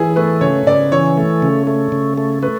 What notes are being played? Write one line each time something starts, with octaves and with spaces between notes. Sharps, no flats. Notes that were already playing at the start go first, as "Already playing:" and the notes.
Already playing: E3 E4 G#4
A3 B4
C#3 C#5
C#3 D5
E3 C#5
A3
C#3
A3
C#3
A3
A3 B4